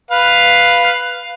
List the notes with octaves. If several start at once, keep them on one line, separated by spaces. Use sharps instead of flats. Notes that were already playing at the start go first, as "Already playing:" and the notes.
B4 F5